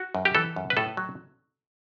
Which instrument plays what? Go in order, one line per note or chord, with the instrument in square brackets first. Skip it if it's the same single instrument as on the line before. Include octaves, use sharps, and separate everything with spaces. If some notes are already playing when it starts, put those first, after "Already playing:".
Already playing: [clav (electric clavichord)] F#4
F#2
G4
E3 A4
F#2
B4
A2 A4
F#3